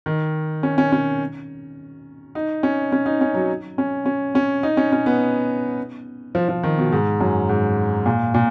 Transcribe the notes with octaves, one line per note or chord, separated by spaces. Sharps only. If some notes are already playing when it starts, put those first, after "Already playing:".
D#3
C#4
C#4
C#4
D#4
C#4
C#4
D#4
C#4
F#3
C#4
C#4
C#4
D#4
C#4
C#4
B3
F3
F3
D#3
B2
G#2
F#2
G#2
A#2
A#2